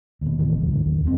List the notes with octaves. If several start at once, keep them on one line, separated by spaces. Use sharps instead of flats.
D#2 B2
F#1 A2 D#3 E3
C#2 F#2
G#2 D3
D#2
F#1 F2 B2 C4